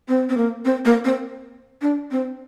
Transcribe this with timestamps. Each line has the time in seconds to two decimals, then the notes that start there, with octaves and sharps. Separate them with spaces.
0.08 C4
0.29 C4
0.37 A#3
0.65 C4
0.85 A#3
1.04 C4
1.82 D4
2.11 C4